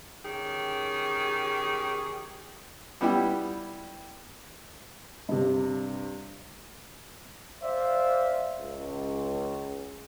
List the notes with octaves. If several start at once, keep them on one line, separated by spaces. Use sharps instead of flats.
D#3 C#4 G4 G#4
G3 B3 E4 G4
G2 C3
C5 D5 E5 F5
C#2